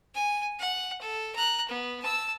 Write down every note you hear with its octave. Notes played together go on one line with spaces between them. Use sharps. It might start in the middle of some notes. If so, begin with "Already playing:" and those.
G#5
F#5
A4
A#5 F#6
B3
A5 E6